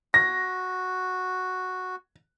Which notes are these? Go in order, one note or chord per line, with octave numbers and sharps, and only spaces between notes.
F#4 A#6